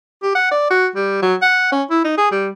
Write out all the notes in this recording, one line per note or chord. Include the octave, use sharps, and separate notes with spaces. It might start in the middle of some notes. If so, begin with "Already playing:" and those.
G4
F#5
D5
F#4
G3
F#3
F#5
C#4
E4
D#4
G#4
G3